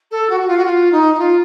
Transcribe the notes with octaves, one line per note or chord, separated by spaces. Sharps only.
A4
F#4
F#4
F4
F#4
F4
D#4
D#4
F4